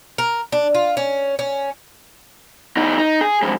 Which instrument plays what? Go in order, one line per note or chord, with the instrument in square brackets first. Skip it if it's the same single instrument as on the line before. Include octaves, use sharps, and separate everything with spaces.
[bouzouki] A#4
D4
F4
C#4
C#4
[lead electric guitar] E2 D#4
D#4
G#4
F2 G#2